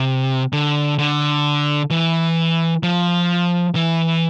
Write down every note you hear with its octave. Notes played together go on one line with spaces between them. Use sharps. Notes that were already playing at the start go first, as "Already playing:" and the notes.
Already playing: C3
D3
D3
E3
F3
E3